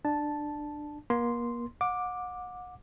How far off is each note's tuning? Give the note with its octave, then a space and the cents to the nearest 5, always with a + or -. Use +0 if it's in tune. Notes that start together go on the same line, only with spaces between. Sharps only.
D4 +20 A5 -5
A#3 +35 C6 -5
F#5 -35 D6 +5